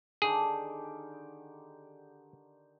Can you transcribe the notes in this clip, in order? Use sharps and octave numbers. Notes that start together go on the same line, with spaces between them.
D3 D#3 G4 G#4